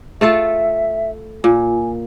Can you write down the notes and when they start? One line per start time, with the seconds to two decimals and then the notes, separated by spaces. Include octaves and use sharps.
0.21 A3 F4 A4 E5
1.44 A#2 G#5